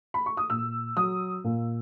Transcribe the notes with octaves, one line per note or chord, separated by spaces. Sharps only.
B5
C#6
D#6
A#2 E6
F#3 D#6
A#2